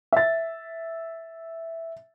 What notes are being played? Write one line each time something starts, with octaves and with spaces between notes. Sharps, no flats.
E5 A6